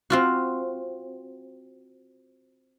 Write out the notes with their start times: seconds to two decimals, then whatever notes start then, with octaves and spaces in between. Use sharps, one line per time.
0.10 C4 F4 F#4